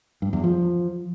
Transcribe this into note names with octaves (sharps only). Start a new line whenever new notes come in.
G2
E2
F3